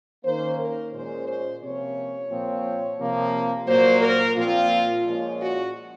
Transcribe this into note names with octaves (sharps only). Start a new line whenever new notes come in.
D#3 A#3 C#4 C5
A#4
A#2 G#3 C#4 C5
C5
C3 F3 A#3 C#4 C#5
A#2 F3 C4
C3 F3 A#3
A#2 F#3 A#3 C5
A#4
A#2 F3 C4 F4
A#2 F3 G#3 C#4
F#4